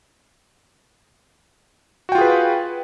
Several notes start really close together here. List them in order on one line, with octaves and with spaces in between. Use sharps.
F#4 G5 F4 G#4 B4